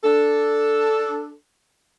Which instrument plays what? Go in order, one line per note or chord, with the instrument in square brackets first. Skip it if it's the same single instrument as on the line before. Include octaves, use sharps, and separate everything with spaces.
[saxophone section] D4 A4